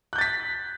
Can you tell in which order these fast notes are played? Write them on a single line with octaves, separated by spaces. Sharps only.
F#6 G6 A6 B6